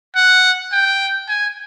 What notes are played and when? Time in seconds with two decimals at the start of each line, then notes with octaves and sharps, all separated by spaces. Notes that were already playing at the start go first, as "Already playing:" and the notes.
0.15 F#5
0.72 G5
1.29 G#5